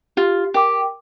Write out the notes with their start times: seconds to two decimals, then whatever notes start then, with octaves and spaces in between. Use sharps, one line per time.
0.17 F4 G4
0.54 G4 A#4 G5 D6